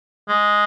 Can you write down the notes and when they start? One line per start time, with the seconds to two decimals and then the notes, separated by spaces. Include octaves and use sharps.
0.29 G#3